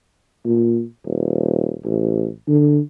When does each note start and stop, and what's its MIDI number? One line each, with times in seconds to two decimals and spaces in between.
0.46 0.82 46
1.06 1.75 27
1.84 2.27 33
2.48 2.80 50